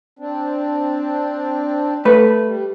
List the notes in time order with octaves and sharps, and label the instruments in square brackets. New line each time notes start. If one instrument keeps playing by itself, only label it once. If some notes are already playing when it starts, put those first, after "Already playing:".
[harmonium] C4 D4
[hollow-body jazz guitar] A3 B4
[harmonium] G3